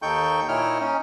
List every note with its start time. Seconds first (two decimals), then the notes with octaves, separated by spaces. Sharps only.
0.02 D#2 D#4 A4 G5 C#6 G6
0.48 A#2 D#4 E4 C#5 G5 F6
0.81 C#4 D#4